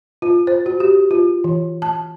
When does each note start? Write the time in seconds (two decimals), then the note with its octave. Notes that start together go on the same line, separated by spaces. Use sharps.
0.22 F4
0.47 C5
0.66 F#4
0.80 G4
1.11 F4
1.44 E3
1.82 A5